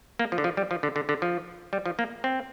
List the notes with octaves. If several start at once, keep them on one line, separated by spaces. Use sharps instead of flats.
A#3
F3
D3
F3
G3
F3
D3
D3
D3
F3
G3
F3
A#3
C4